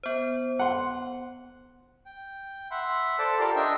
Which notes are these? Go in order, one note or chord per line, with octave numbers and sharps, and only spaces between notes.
B3 C5
F#5 C6
G5
E5 F#5 B5 C6
A4 C5 D5 A5
F4 G4 A4 A#4 D5 F5
D4 D#5 E5 G5